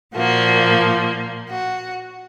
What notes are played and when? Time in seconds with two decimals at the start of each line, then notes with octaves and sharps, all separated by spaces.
0.14 A#2 F3 A#3 F#4
1.51 F#4